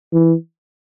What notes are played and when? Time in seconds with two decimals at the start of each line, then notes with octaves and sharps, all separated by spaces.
0.13 E3